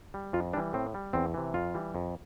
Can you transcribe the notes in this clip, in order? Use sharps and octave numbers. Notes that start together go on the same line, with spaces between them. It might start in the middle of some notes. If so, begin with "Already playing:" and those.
G3
F2 F4
E3 G3 D4
A2 C4
G3
E2 C4
C3 E3
F2 F4
E3 G3
F2